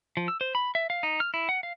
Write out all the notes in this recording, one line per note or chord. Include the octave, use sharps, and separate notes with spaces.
F3
E6
C5
B5
E5
F5
D#4
F6
E4
F#5
F5